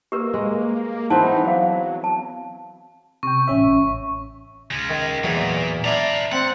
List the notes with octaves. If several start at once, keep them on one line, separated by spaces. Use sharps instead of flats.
A#3 G4 A#4 B4
G#3
E3 B3 C4 D#4 A5
F#3 C5 F5
A5
C3 G5 C#6
A1 C#4 E5
C#3 G#3
D#3
E2 A#2 E3 F#3
D4 E4 D5 A#5
C4 F#5